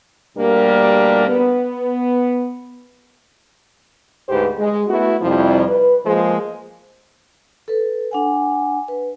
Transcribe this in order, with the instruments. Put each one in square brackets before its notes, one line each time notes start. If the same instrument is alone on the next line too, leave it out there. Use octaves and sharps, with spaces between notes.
[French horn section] D2 B2 G3 A#3 D4 A#4
B3
D2 G#2 G4 B4 C5
G#3
A3 B3 E4 F#4
F2 C3 F3 G3 E4
B4
F3 G#3 A#3 G#4 C5
[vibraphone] A4 B4
D4 F#5 G#5
B4